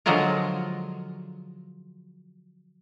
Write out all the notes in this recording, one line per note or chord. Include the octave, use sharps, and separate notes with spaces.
D3 F3 F#3 G#3 F4 A#4